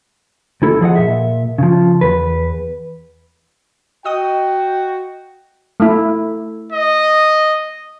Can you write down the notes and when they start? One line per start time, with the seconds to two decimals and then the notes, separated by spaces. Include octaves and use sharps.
0.62 D2 E4 A4
0.81 F3 G#4 D#5 F#5
0.95 A#2 E5
1.58 C#3 F3
2.01 E2 B4
4.05 F#4 D#5 G5 D#6
5.80 A3 E4
6.72 D#5